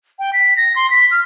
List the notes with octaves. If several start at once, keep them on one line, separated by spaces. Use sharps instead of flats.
G5
B6
A#6
C6
B6
F6